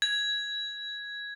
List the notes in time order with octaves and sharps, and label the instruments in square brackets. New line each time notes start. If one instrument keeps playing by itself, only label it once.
[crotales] G#6